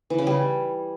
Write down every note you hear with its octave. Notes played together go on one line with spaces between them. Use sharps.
E3
C#3
G3